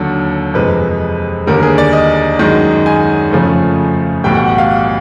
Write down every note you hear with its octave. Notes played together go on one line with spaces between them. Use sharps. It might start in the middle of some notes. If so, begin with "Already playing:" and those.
Already playing: D#2 D3 F#3 A4
F2 C3 E3 G#3 B4
D#2 D3 G3 A#4
G#4
D5
D#5
F#2 D#3 G#3
G#5
F2 C#3 F3 A3
B1 A2 E3 G3 G5
F#5
F#5
F5